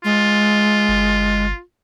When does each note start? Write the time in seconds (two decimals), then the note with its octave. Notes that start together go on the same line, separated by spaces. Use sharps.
0.04 G#3 F4
0.89 G1